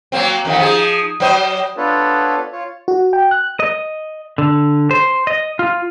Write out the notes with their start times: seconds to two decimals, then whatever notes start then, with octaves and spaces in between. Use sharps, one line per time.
0.12 F#3 A#3 C4
0.45 F2 D#3 A3
0.58 F3 D#4 G#4
1.20 F#3 C5 D#5
1.77 B3 D4 F4 A4 B4 C#5
2.53 F4 C#5
2.88 F#4
3.13 G5
3.31 F#6
3.60 D#5
4.38 D3
4.91 C5
5.27 D#5
5.59 F4